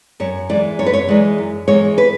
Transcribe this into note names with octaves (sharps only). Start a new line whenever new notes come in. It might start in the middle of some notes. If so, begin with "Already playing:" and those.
F#2 C#5
E3 G#3 D5
F#2 C#5
B4
C#5
E3 G#3 D5
F#2
E3 G#3 C#5
B4